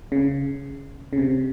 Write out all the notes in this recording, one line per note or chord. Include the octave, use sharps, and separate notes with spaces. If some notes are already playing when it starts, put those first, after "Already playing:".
C#3
C#3
C3